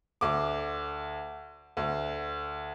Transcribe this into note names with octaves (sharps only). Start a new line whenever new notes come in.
D2 D6
D2